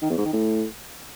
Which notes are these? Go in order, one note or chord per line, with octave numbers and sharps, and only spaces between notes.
D#3
E2
G#2
D#3
A2